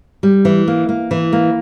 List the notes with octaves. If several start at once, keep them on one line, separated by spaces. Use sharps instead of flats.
G3
E3
A#3
A#3
E3
A#3